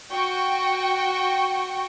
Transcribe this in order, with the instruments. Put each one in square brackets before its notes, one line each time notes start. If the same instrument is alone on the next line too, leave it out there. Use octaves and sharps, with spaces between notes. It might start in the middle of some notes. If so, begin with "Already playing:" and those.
[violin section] F#4 G5 C#6